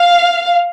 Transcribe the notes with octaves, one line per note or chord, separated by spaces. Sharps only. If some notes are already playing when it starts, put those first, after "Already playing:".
Already playing: F5